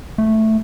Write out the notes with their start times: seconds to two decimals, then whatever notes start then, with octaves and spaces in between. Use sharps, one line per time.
0.18 A3